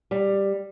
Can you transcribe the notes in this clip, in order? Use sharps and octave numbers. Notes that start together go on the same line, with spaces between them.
G3